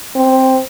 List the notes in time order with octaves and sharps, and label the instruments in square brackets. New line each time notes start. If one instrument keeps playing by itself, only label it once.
[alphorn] C4